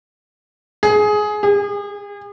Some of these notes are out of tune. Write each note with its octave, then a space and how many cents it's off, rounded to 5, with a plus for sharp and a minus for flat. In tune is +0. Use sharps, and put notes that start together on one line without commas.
G#4 +15
G#4 -40